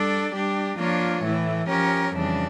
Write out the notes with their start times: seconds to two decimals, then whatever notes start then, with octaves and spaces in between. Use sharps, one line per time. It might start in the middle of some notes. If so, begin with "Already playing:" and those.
Already playing: G3 D4 A4 D5
0.32 G3 D4 G4
0.77 F3 A#3 D4 F4 C#5
1.22 A2 E3 A3 E4
1.68 F3 C#4 G4 A#4 C#5
2.14 F2 C#3 E3 G3 D4